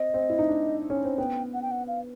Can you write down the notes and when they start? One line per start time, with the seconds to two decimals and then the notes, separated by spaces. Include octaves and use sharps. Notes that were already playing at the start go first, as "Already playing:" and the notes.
Already playing: C4 D#5
0.14 C4
0.30 E4
0.39 D#4
0.48 D4
0.90 C#4
1.05 C4
1.18 B3 G5
1.54 F#5
1.62 G5
1.71 F#5
1.88 F5